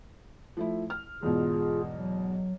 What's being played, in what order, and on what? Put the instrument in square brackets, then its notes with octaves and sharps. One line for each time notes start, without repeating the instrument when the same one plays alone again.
[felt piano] F3 A3 E4
F6
[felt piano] E2 G#2 B2 [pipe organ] F4 G#4
[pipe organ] F#3